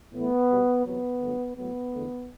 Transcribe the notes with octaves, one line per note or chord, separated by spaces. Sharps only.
A2 E3 A3 B3
B2 G3
E2 C3 F#3 B3
G2 D3 F#3 A3
A2 F#3 A3 B3
E2 D3 A3